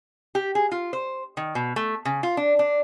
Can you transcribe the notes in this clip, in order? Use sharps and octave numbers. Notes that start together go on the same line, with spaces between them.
G4
G#4
F4
C5
D#3
B2
A3
C#3
F4
D4
D4